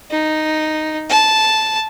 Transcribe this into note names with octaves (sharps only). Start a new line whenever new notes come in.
D#4
A5